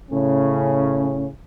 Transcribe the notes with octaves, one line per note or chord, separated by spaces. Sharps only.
A2 C#3 C#4